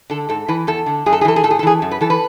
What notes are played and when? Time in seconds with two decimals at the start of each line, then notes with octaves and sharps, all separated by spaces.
0.10 D3 A4
0.29 G#2 A4
0.48 E3 B4
0.67 E2 A4
0.86 D3
1.06 F#2 G#4
1.13 A4
1.21 G#4
1.25 E3 A4
1.36 G#4
1.44 A2 A4
1.51 G#4
1.59 A4
1.63 E3 G#4
1.82 F#2
1.91 B4
2.01 E3 A4
2.10 B4